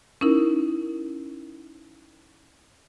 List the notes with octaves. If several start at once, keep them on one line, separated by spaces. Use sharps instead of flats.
C#4 D#4 E4 A#4